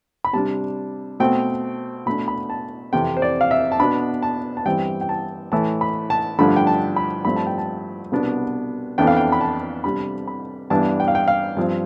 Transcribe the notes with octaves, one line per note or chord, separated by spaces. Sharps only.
B5
C3 G3 D4 A5
B2 A3 C4 G5
B2 A3 D4 B5
B5
A5
F2 C3 E3 G5
C5
D5
F5
E5
A5
B2 B3 D4 B5
A5
A5
G2 E3 G3 C4 G5
G5
A5
A2 E3 A3 A5
B5
A5
G2 D3 F3 A3 D4 B5
G5
A5
B5
G2 F3 A3 C4 B5
A5
G5
A5
C2 B2 B3 D4
F2 E3 B3 D4 G5
F5
G5
B5
A5
C3 G3 D4 B5
B5
G2 E3 B3 D4 A5
G5
F5
G5
F5
G2 F3 C4